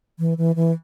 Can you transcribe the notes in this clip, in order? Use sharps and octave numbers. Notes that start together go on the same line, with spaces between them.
E3
E3
E3